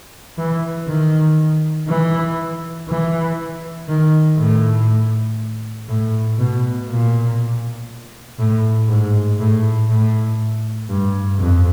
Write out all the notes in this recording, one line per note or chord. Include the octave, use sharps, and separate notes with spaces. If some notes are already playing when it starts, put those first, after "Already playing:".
E3
D#3
E3
E3
D#3
A2
A2
B2
A#2
A2
G#2
A2
A2
G2
F2